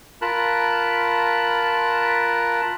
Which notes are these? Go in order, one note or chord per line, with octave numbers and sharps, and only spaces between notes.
F4 A#4 A5 B5 F#6